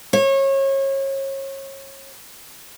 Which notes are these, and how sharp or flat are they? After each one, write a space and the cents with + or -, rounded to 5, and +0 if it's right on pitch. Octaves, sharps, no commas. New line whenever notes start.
C#5 -30